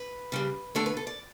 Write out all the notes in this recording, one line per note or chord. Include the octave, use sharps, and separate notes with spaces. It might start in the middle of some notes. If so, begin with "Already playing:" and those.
Already playing: B4
C#3 G3 D4
D3 A3 D4 A4
B4
A4
D5